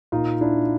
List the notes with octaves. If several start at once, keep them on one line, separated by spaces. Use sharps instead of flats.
A#2 D#4 F4
D4 E4